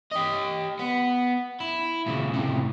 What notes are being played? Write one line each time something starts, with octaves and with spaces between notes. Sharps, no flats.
G4 D#5
B3
E4
A#2 C#3
A2 C3